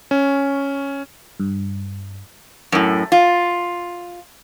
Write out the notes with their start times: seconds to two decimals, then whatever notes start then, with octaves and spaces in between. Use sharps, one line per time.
0.11 C#4
1.40 G2
2.72 F#2 A2
3.12 F4